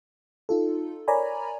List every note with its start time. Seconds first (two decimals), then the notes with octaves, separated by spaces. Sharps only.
0.49 D#4 F4 A4
1.08 A#4 C#5 D5 G#5 A#5 B5